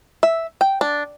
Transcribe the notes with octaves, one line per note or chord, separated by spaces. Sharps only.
E5
G5
D4